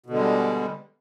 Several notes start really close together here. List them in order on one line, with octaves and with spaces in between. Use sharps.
B2 D3 G#3 G3